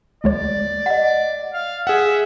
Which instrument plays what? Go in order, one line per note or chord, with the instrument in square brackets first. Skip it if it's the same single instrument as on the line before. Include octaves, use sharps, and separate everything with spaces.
[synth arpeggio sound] D2 G#3 C#5 [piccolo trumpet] D5
[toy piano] D#5 F#5
[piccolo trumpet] F5
[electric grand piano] G#4 F#5 [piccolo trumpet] E5